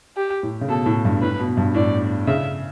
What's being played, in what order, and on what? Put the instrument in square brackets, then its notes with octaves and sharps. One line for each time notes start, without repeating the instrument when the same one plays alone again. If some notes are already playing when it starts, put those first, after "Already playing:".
[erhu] G4
[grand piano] A2
C#3
[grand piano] B2 [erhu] A4
[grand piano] A2
G2
[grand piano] A2 [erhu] B4
[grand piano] B2
G2
[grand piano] A2 [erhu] D5
[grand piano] C#3 [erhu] E5